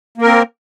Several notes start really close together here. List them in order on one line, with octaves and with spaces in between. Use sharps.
A#3 A#4 C4